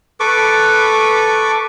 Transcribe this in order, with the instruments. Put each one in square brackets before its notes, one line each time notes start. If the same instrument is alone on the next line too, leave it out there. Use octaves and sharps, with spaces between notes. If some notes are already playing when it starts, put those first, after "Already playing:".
[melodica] A4 B4 C#6 D6